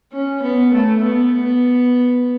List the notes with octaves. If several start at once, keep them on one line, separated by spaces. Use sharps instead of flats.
C#4
B3
A3
B3
B3